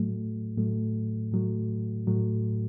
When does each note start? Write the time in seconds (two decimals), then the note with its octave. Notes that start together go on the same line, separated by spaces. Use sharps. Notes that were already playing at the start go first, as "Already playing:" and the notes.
Already playing: A2 F#3 A3
0.57 A2 F#3 A3
1.32 A2 F#3 A3
2.07 A2 F#3 A3